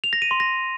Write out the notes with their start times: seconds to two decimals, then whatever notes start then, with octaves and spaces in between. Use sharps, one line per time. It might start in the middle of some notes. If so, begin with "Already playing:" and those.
0.04 F7
0.13 A#6
0.22 D#7
0.31 C6
0.40 A#6